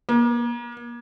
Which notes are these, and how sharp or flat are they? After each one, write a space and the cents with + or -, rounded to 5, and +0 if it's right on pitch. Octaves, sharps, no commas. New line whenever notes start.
A#3 +35